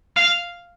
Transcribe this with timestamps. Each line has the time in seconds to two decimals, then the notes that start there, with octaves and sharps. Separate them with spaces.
0.16 F5